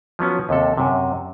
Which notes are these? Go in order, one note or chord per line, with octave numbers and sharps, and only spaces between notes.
F3 F#3 B3 C#4
D#2 C3 A4
F#2 C3